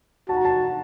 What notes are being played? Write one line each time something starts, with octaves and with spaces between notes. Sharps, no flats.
F#4 A5
A#5
A5